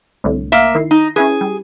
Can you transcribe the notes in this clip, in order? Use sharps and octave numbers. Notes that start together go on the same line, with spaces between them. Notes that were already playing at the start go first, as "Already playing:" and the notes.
C2 A2 D3
A#3 E5
D#3 E4 C7
D#4
C#4 E4 G#4 B4
G3